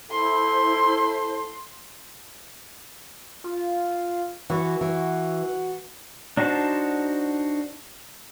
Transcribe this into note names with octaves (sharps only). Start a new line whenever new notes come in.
E4 A4 C5 C6
F4
E3 F#4
E3
D4 D#4 F#4 C5 A5